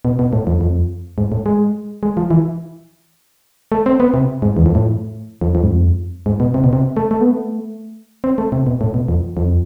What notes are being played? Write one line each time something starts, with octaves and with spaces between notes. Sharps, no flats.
B2
B2
A2
F2
F2
G#2
A2
G#3
G#3
F3
E3
A3
C4
B3
C3
G#2
E2
F2
A2
F2
F2
G#2
F2
G#2
B2
C3
B2
C3
A3
A3
B3
A3
C4
A3
C3
B2
A2
B2
F2
F2